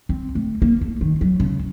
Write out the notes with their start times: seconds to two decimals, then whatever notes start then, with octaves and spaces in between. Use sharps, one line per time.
0.09 C4
0.35 A3
0.62 A#3
0.81 A3
1.01 D#3
1.21 F#3
1.40 C#3